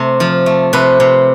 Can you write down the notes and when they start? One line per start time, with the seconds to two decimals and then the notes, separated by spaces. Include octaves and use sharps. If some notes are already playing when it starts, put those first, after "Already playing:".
Already playing: C3 A3
0.20 F3
0.46 A3
0.73 C3 B4
1.00 C3